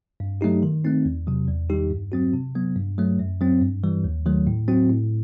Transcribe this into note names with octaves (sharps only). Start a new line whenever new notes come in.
G2
F#3 A3 D#4 G4
D#3
A3 C4 D#4
E2
C3 F#3
E2
D#3 G3 D#4 G4
G2
F#3 C4 F#4
C3
F#3 B3
G2
F#3 A3
F#2
F#3 C4
G2
E3 G3
D#2
D#3 F#3 A3
A2
F#3 C4 F#4
A2